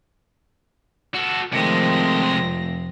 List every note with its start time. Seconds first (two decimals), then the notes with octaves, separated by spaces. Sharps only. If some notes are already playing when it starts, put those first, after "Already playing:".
1.15 F#4 A4
1.53 C3 D#3 F3 G#3 A3 C4 A#6
2.29 F1 F2